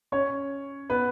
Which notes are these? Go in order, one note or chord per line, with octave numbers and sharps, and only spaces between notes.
C#4 C#5
B3 B4